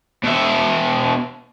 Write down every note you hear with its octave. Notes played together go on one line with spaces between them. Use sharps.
B2 E5